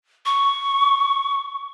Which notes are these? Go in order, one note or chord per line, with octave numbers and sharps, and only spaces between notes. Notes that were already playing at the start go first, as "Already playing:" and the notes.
C#6